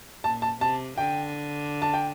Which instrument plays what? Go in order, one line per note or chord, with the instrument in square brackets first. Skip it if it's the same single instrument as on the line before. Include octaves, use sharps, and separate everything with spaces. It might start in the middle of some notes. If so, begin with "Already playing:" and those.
[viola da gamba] A#2 [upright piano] A5
[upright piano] A5
[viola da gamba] C3 [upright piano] A5
[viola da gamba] D3 [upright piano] G5
[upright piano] A5
G5